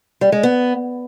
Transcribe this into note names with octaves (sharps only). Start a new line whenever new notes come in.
G3
G#3
B3